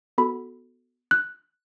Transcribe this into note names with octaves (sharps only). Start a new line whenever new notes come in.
B3 F#4 A4 B5
F#6